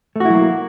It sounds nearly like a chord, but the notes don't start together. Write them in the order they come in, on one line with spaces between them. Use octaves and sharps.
A3 F#4 E4 F#3 A#3